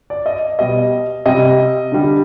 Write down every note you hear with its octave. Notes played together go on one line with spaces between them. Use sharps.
D5
D#5
B2 G3 D#5
C3 G3 D#5
D3 G3